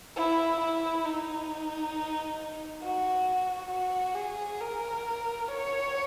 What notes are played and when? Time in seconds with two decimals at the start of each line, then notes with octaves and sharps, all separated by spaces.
0.16 E4
0.61 E4
1.05 D#4
2.82 F#4
3.71 F#4
4.15 G#4
4.60 A#4
5.48 C#5